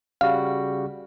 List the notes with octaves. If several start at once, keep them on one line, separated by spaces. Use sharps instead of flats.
C#3 G3 F#4 F5